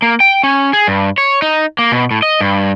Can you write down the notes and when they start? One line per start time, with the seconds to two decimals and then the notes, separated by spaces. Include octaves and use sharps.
0.02 A#3
0.20 G5
0.43 C#4
0.73 G#4
0.87 G2
1.18 C#5
1.42 D#4
1.79 A#3
1.92 B2
2.11 A2
2.22 D#5
2.41 G2